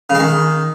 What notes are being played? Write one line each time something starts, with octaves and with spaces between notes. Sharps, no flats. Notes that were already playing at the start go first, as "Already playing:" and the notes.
C#3
G#3
D#3